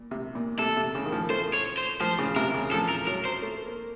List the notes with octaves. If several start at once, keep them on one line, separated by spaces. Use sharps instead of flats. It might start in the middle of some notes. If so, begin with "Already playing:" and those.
Already playing: A#2
C3
A#2
C3 A4
C3
C#3
D#3
F3
A3 C5
C#5
C5
F3 C5
C#3
C3 A#4
C#3
F3 A4
A#4
F#3 A#4
C5
A3
A#3